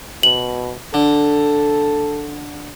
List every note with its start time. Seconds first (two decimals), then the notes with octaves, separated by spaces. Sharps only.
0.23 B2 F#7
0.94 D3 A4